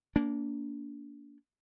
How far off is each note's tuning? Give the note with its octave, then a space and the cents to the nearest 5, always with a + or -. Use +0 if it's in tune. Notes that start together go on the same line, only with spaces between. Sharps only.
A#3 +0 D4 -35